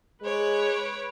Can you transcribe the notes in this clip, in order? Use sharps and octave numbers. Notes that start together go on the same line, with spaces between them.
G#3 B4 C#5 D6